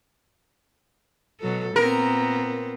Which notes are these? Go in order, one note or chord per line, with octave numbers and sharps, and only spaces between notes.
B2 F#3 A4
A#2 B3 C4 A#4